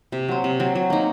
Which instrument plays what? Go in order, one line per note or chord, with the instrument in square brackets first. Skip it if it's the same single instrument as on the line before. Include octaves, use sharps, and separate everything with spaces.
[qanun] C3
F#3 C4
C3
F#3 C4
F#3
A#3 D#4